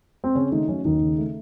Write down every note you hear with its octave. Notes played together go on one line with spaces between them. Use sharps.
C4
C#3 C#4
D#3 A3 D#4
F#3 C#4
D#2 D#3 D#4
C#3
A3